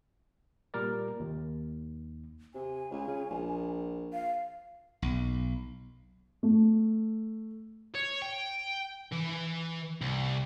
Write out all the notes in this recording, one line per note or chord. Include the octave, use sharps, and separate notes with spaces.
A#2 G3 A#4 D5
D#2
C3 G#5
C#2
C#3
A#1
F5
B1
A3
C#5
G5
E3
C2